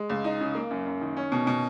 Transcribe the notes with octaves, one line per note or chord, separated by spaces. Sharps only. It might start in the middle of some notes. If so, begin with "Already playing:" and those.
Already playing: G#3
C#2
D#4
C#3
A#3
F#2
F#2
D#3
C#4
B2
B2